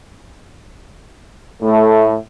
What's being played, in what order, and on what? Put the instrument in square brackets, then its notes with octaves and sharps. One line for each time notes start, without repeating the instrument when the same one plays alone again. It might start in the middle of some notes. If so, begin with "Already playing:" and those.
[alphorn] A2 [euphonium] A3